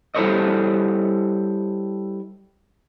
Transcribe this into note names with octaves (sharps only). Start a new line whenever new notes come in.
G3 E4 A4 C5 C#5 D#5